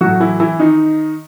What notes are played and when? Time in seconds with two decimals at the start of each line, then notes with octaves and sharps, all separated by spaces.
0.01 A2 F#3 F#4
0.20 E3 E4
0.40 E3 E4
0.59 D#3 D#4